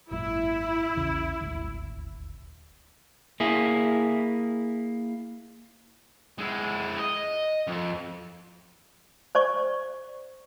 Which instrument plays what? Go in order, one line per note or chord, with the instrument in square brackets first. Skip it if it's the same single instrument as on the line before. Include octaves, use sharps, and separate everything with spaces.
[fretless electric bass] G#1 F#2 A#2 [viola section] E4
[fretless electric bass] A#1 E2 C#3
D#1 G#1 D2
[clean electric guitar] A#3 E4 G#4
[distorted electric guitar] G#3 E4
D#5
F2
[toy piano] C5 D5 C#6